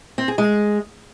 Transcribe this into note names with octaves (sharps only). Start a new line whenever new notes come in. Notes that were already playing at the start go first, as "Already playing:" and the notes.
C4
G#4
G#3